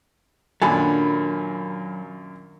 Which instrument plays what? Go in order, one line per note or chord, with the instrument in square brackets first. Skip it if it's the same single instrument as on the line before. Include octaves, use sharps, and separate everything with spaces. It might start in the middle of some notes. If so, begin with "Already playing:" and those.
[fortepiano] F#2 A#2 [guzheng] D#3 D4 [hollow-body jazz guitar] F#3 A4 [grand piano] G#5 B5